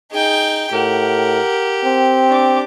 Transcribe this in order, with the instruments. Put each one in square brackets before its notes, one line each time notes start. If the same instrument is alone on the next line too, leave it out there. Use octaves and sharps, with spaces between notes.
[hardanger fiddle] D#4 G5 [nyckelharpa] G#4
[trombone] A2 [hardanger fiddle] G4 [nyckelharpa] A#4 F#5
[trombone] C4
[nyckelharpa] D4 D6